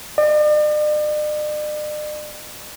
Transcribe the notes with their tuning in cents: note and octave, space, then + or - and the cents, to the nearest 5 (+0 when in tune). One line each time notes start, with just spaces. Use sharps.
D5 +45